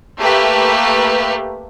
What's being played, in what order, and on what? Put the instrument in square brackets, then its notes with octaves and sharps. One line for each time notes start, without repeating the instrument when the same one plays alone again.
[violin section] A3 A#3 G4 B4